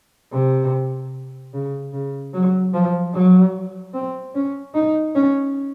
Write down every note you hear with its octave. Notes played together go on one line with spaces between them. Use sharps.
C3
C#3
C#3
F#3
F3
F#3
C4
C#4
D#4
C#4